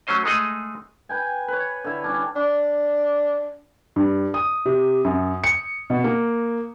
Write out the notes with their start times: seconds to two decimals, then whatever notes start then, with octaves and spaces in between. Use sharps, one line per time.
0.07 F#3 A3 C#4 C5 D#5
0.25 G#3 A3 D#4 G#4 D#5
1.09 B4 G5 G#5
1.48 B4 C#5
1.84 D3 E4
2.04 G3 C#4 D4
2.36 D4
3.96 G2
4.34 D#6
4.66 C3
5.04 F#2
5.44 C#7
5.90 B2
6.04 A#3